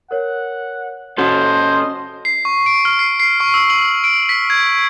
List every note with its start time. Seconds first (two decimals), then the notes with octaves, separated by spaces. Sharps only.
0.11 A#4 C#5 F#5
1.18 C#4 F#4 A4 C5 D#5 F#5 G#6
2.25 C7
2.45 C#6
2.66 D7
2.85 F6
2.99 C7
3.20 C7
3.40 C#6
3.54 E6
3.70 F#7
4.04 D7
4.29 B6
4.50 G#6